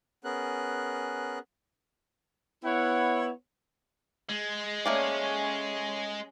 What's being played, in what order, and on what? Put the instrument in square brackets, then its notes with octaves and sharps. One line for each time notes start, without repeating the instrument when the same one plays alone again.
[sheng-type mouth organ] B3 C#4 G#4 A#4 F#6
[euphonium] B3 [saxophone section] E4 C#5 [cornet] F#5
[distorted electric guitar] G#3
[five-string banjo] A3 A#3 D5 [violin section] C#4